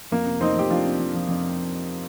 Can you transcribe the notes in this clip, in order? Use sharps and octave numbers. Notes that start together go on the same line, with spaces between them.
F2 A#3
C3
F2 C4 D#4
F3 G4
F2 D4 F4
C3
F2
F3
F2